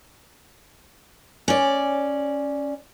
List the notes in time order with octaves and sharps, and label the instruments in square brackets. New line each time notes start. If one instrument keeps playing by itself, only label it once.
[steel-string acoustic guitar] C#4 D5